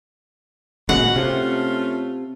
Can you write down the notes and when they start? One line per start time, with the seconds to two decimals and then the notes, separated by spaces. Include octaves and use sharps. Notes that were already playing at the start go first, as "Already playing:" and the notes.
0.89 A#2 C#3 G#3 B3 C#4 F#4 F#5
1.16 C3 A3 C#4 F4